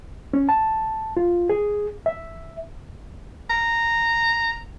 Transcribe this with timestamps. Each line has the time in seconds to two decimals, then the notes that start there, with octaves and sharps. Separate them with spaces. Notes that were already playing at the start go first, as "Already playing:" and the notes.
0.33 C#4
0.49 A5
1.17 F4
1.49 G#4
2.06 E5
3.50 A#5